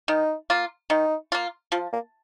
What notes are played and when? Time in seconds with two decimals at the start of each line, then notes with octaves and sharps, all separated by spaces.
0.08 D#3 D#4
0.50 A#3 F4
0.90 D#3 D#4
1.32 A#3 F4
1.72 F3 F4
1.93 A#3